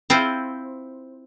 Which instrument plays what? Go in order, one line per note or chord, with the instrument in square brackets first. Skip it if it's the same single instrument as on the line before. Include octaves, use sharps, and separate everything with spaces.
[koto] C4 E4 F4 C5